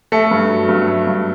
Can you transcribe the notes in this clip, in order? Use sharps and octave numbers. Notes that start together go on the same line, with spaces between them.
A3 A4
G2
F#3
G2
A3
G2